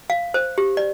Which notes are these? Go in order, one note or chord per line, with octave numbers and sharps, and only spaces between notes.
F5
C5
G4
D5